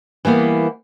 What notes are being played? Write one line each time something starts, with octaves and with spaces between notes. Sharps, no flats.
E3 G3 A#3 B3